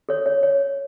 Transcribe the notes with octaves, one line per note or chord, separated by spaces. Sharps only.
A4 C#5
C#5
C#5